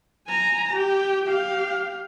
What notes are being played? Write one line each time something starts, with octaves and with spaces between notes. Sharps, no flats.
G#5 A#5
G4
G4 F5